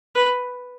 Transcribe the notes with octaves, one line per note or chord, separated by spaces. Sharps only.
B4